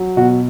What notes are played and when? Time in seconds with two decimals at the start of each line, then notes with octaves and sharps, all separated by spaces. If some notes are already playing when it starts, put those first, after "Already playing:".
Already playing: F#3
0.17 B2 F#4